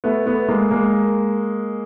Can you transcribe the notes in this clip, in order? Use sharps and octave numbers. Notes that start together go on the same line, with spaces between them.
A3 B3
A3 B3
G#3 A#3
G#3 A#3